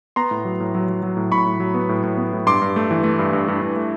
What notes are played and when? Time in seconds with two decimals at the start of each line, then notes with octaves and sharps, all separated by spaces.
0.16 B3 A#5 C6
0.31 A2
0.45 F#3
0.60 A2
0.75 F#3
0.89 F#3
1.03 F#3
1.17 A2
1.32 A2 B5 C#6
1.46 A2
1.60 F#3
1.74 B3
1.89 A2
2.03 A2
2.17 B3
2.33 A2
2.46 G2 C6 D6
2.62 G2
2.76 A3
2.91 E3
3.04 A3
3.19 G2
3.33 G2
3.48 G2
3.62 G2
3.76 A3